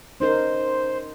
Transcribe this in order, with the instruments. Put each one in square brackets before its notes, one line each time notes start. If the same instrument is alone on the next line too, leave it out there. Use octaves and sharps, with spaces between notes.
[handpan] C#4 D#4 A#4 [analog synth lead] C5